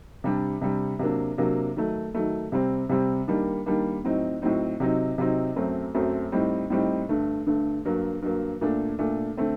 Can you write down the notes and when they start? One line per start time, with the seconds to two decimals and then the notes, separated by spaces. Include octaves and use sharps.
0.24 C3 G3 D4
0.61 C3 G3 D4
0.99 C3 F#3 A#3 D4
1.38 C3 F#3 A#3 D4
1.76 D#3 F#3 A3
2.14 D#3 F#3 A3
2.52 C3 G3 C4
2.89 C3 G3 C4
3.28 D#3 G3 A#3 D4
3.66 D#3 G3 A#3 D4
4.04 A2 F#3 C4 D#4
4.42 A2 F#3 C4 D#4
4.80 C3 F#3 C4 D#4
5.18 C3 F#3 C4 D#4
5.56 F#2 F#3 A3 C4
5.95 F#2 F#3 A3 C4
6.32 A2 G3 C4 D#4
6.70 A2 G3 C4 D#4
7.09 G2 D3 A3
7.46 G2 D3 A3
7.85 G2 F#3 A#3
8.22 G2 F#3 A#3
8.61 A#2 A3 D4
8.99 A#2 A3 D4
9.37 D3 A3 C4